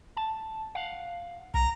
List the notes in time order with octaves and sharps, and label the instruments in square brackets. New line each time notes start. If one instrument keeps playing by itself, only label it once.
[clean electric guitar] A5
F5 F#5
[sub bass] B1 [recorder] A#5